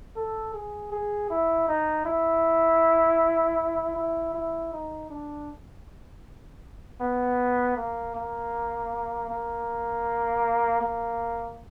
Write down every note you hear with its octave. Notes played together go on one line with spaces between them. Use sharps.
A4
G#4
G#4
E4
D#4
E4
E4
E4
D#4
D4
B3
A#3
A#3
A#3
A#3